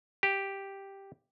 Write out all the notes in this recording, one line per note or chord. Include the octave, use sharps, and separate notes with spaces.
G4